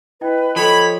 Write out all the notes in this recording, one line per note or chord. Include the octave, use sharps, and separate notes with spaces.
E4 B4 D#5 G5
F3 A4 C#5 D#5 G5 B5 G#6